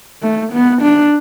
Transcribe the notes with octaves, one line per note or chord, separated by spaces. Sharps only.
A3
B3
D4